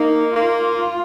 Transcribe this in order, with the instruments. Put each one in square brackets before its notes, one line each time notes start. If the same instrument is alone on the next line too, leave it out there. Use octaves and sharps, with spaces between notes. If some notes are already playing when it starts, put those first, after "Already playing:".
Already playing: [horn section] A#3 [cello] D#4
[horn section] A#3 [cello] F4